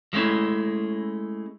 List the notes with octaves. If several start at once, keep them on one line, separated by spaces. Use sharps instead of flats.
F3 G#3 A3 C#4 E4